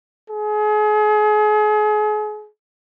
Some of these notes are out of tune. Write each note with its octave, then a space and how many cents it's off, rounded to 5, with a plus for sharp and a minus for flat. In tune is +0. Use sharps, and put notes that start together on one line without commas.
G#4 +35